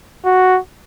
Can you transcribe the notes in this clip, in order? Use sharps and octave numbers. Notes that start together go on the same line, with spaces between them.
F#4